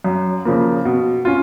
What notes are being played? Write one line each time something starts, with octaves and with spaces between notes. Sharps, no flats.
F#2
C#3 F3 A#3
B2
C#4 F4